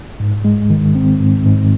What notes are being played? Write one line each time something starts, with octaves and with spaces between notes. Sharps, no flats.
G#2
G#3
D#3
C4
G#2
G#2